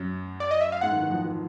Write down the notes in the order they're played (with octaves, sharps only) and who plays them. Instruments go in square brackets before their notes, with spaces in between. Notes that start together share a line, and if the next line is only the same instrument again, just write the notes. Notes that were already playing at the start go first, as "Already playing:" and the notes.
Already playing: [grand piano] F#2 F#3
[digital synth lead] D5
D#5
E5
F5
[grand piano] G#2 G#3 [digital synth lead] F#5
[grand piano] D#3
E3
F2 F3
E3